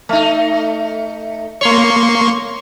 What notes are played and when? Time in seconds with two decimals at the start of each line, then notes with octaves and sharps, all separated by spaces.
0.09 A3 D#4
1.61 A#3 C#5 C6 C#6